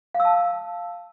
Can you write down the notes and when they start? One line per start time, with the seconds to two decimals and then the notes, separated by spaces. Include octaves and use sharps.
0.14 F5
0.20 E6
0.25 A5